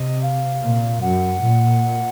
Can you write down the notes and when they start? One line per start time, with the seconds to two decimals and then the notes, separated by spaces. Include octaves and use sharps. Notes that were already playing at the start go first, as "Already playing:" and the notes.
Already playing: C3 D#5
0.22 F5
0.63 A#2
1.01 F#2 F#5
1.42 A#2